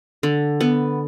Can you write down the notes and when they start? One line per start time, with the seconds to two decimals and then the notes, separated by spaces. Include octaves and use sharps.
0.23 D3
0.60 B3